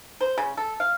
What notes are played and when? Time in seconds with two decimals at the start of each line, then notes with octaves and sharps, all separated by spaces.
0.21 C5
0.38 C#3
0.57 A4
0.80 F5